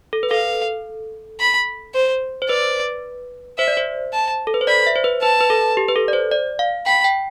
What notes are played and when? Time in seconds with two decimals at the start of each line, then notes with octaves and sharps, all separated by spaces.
0.13 A4
0.23 B4
0.31 A4 F5
1.40 B5
1.94 C5
2.42 C5
2.49 B4 D5
3.58 C5 E5
3.68 D5
3.77 C5
4.13 A5
4.47 A4
4.54 B4
4.61 C5
4.67 D5 B5
4.87 E5
4.96 C5
5.04 B4
5.23 B4 A5
5.41 B4
5.50 A4
5.77 G4
5.88 B4
5.96 A4
6.08 D5
6.13 C5
6.31 D5
6.59 F5
6.86 G5 B5
7.04 G5